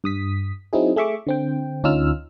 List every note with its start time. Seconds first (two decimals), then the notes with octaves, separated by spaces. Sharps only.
0.04 G2 D#6 B6
0.73 F#3 C4 D#4 E4 G#4
0.96 A3 G#4 E5 C#6 D6
1.27 D3 C4 G5
1.84 D2 C#4 D#4 F4 E6 F6